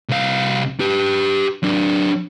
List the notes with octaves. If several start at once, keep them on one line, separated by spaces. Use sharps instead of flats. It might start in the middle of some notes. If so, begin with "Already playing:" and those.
C2 F5
G4 B4
F#3 D4